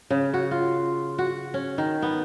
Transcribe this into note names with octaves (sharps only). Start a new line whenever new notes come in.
C#3
F#4
F4
F#4
C#4
D#3
B3